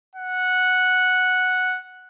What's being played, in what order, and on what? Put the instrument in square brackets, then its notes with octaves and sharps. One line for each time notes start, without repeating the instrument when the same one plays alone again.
[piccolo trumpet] F#5